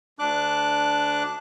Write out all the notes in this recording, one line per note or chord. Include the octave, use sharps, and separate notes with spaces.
D2 D4 D6 F#6